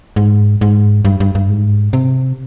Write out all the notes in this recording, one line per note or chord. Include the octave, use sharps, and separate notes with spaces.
G#2
G#2
G2
G2
G2
G#2
C3